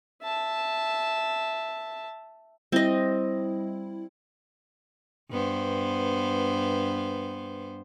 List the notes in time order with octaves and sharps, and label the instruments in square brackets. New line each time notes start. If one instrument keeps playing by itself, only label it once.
[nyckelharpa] E5 A5
[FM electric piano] G3 E4 [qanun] C4 D#5
[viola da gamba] G2 B3 C5